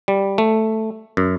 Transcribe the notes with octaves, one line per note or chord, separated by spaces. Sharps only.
G3
A3
F#2